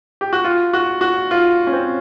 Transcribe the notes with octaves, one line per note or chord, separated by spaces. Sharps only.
G4
F#4
F4
F#4
F#4
F4
C#4
C4